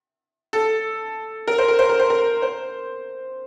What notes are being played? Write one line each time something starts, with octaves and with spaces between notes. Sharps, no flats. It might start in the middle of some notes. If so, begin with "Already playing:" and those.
A4
A#4
C5
A#4
C5
A#4
C5
A#4
C5